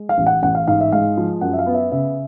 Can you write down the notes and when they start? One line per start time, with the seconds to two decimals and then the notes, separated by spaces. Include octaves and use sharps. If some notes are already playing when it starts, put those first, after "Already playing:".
Already playing: G#3
0.09 F5
0.18 A1
0.26 F#5
0.43 A1 F#5
0.55 F5
0.68 G#2 F5
0.81 E5
0.92 G#3 F5
1.17 F3
1.41 F#2 F#5
1.53 E5
1.59 F5
1.66 B3
1.74 E5
1.92 C#3 E5